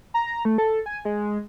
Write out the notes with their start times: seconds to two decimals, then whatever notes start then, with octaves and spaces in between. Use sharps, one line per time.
0.14 A#5
0.45 A3
0.58 A4
0.86 G#5
1.05 G#3